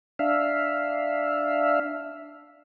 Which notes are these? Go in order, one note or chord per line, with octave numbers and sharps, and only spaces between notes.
D4 E5 F5